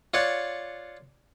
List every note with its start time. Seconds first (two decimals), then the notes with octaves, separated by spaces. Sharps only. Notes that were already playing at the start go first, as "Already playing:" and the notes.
0.14 F4 C#5 D5 F#5